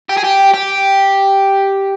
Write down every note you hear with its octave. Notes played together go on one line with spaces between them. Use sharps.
G4
G#4
G4
G4